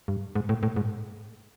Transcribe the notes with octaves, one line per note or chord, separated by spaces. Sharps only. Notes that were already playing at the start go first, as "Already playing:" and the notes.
G2
G#2
A2
A2
G#2